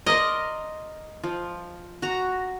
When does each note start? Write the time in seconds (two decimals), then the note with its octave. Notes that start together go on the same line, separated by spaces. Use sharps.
0.06 A#4 D5 D#5 C6
1.23 F3
2.02 F#4 A#5